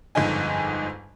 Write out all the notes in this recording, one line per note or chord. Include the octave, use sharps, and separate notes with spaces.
G1 F2 G#2 D3 D#4 G#5